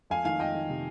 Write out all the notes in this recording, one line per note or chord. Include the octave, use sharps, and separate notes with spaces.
F2 F5 G#5
D#3 F5 G#5
F2 D#5 G5
D#3
C3